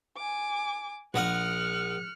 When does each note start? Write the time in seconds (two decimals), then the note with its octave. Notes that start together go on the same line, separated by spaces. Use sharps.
0.17 G#5 D6
1.14 A#1 D#5 F#5 F6 F#6 C#7